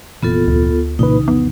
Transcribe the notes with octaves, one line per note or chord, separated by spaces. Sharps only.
F1 A#2 E3 B3 F4 A4
D2
C2 A#2 C#3 E3 D#4 B4
F2 B3